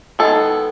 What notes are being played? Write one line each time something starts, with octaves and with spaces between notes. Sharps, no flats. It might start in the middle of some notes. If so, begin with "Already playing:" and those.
D#3 G#3 B3 A4